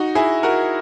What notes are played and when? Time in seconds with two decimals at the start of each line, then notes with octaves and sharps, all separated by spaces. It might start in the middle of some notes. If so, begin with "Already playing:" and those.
Already playing: D#4 F#4
0.15 E4 G#4
0.43 F#4 A#4